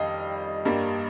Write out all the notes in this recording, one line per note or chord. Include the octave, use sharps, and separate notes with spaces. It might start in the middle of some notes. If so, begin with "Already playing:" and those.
Already playing: F2 D#3 G3 D#5 F5
G2 G3 A#3